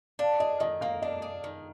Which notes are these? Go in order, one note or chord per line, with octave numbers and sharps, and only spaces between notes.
D4 F5
G#4 D#5
D#3 D#5
A#3 F5
D4 D#5
G#4
D#3